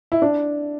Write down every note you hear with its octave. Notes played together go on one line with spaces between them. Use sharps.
E4
D4